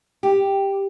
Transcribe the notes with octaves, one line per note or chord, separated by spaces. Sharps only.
G4